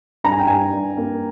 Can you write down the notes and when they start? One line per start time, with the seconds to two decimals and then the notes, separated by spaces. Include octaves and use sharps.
0.24 G2 A#5
0.32 G#5
0.39 G5
0.47 G2 G#5
0.73 G2
0.97 A#3